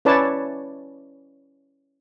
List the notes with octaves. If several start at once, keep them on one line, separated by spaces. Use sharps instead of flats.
C#4 E4 B4 C#5 D5 A5